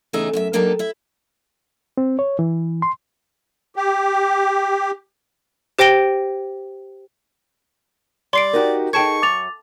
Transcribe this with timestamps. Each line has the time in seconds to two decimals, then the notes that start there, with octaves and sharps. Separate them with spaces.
0.13 E2 C#3 A3 D#4 G#4 E5
0.33 F#2 F#4 E5
0.53 F#3 A#3 D4 D#4 G4 A4
0.79 E4 E5
1.98 C4
2.19 C#5
2.39 E3
2.82 C6
3.76 G4
5.79 G4 C5 G5 A#6 D7 G7
8.33 G3 D5 C6 C7 D7
8.53 D#4 F#4 G4 A#4
8.93 D#4 G#4 A4 G5 A5 C#6 G#6
9.22 F#2 D6 A6 F7